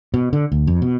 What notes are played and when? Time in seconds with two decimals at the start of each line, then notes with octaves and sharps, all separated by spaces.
0.14 B2
0.33 D3
0.52 D2
0.67 F2
0.82 B2